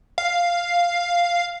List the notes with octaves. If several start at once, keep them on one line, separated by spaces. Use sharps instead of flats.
F5